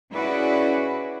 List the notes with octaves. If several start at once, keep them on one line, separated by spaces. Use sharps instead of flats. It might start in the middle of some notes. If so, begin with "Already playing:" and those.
C#4 E4 F#4 G#4 B4 D5